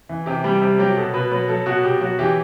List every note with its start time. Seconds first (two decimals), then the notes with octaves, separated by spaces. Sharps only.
0.09 E3
0.26 C3 G4
0.44 G3 G4
0.62 C3
0.78 F#3 G4
0.97 B2 A4
1.14 B2 B4
1.31 F#3 B4
1.48 F#3 A4
1.66 B2 F#4
1.83 B2 G4
2.01 F#3 F#4
2.19 E3 G4